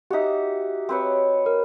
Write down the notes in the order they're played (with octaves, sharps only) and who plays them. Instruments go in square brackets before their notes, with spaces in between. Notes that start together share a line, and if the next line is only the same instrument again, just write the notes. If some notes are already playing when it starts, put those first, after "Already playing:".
[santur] D#4 F#4 [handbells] G4 E5
[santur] C4 B4 C#5
[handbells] A#4